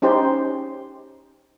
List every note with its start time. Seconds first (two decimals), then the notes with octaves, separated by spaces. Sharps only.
0.02 C#4 D#4 G4 C5